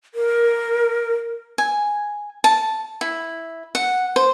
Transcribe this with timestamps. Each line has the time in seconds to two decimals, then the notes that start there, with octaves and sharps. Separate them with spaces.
0.14 A#4
1.58 G#5
2.44 A5
3.01 E4
3.75 F#5
4.16 C5